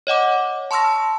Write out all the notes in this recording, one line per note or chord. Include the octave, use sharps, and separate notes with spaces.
C#5 D#5 F#5 D6
A5 C6 C#6 E6 F6 A#6